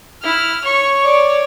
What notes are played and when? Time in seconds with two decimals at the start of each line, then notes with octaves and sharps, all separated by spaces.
0.23 E4 F6
0.65 C#5 C#6
1.04 D5